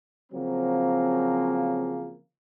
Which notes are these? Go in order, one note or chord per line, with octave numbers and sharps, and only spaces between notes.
C#3 F3 F#3 A#3 C4